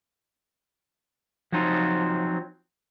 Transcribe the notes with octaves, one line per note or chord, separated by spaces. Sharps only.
F3 F#3 C4 D#4 F4